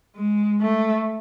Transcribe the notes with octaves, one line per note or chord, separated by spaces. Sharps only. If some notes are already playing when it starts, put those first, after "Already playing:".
G#3
A3